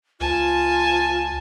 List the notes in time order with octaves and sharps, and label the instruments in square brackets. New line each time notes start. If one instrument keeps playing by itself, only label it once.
[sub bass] C#2 [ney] F4 [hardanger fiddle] G#5 A5